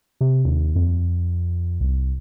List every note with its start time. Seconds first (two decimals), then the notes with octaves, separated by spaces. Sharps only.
0.21 C3
0.45 D#2
0.76 F2
1.81 C2